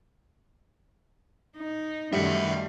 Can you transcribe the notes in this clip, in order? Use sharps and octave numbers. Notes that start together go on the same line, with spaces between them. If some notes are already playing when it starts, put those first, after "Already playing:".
D#4
F#2 D#3 G3 A3 E5 F#5